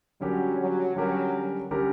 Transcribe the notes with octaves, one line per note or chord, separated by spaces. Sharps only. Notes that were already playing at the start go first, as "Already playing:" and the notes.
D3 F#3 G3 C#4 G4 A#4
F#3
D3 F#3 G3 C#4 G4 A#4
D3 G3 C#4 G4 A#4